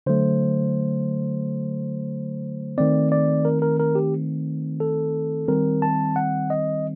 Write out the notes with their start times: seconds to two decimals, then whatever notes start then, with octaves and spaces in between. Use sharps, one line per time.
0.06 D3 F#3 A3 C5
2.78 D#3 A3 C4 D5
3.12 D5
3.45 A#4
3.62 A#4
3.80 A#4
3.95 G4
4.80 A4
5.48 D#3 G3 C4 A#4
5.82 A5
6.16 F#5
6.50 D#5